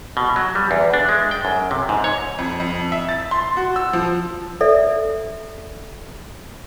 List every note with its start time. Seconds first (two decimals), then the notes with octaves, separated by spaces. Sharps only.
0.17 B2
0.36 F#3
0.55 G3
0.71 E2
0.94 D4
1.09 G#3
1.31 G5
1.45 F#2
1.71 C3
1.89 G#2
2.04 C#5
2.38 F2
2.60 F2
2.92 E5
3.09 A6
3.31 C6
3.57 F#4
3.76 E6
3.93 F3
4.61 A4 D5 E5